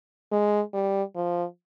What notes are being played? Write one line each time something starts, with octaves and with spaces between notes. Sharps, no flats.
G#3
G3
F3